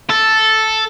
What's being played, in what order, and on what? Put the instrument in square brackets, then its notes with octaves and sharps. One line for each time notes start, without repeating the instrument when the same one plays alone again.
[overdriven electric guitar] A4